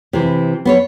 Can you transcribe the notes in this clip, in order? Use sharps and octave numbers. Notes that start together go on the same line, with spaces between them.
C3 E3
B3 C5 C#5